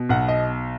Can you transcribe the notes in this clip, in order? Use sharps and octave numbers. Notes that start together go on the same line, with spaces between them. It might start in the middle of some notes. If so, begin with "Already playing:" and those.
Already playing: B2
B1 F#5
D#5